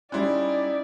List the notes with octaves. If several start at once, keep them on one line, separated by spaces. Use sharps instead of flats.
G3 C#4 D#4 E4 D5 C6 F#6